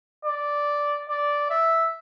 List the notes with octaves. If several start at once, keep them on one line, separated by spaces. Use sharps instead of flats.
D5
D5
E5